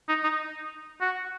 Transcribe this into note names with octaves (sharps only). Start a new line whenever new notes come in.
D#4
D#4
F#4